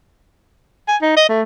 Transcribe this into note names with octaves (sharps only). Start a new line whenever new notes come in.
G#5
D#4
D#5
A3